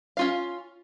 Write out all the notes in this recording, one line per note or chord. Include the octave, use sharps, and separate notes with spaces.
C#4 F4 F5